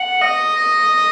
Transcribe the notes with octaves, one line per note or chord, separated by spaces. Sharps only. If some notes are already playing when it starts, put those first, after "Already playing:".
Already playing: F#5
D#5